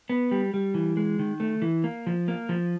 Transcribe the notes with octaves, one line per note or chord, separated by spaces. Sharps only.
B3
G3
G3
E3
G#3
D#3
A3
E3
A#3
F3
A#3
F3